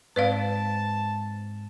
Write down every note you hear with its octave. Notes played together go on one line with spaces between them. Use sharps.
G#2 C4 B4 D5 F5 A5